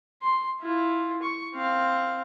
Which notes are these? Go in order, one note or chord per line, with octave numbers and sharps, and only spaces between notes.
C6
E4 F4
C#6
C4 F5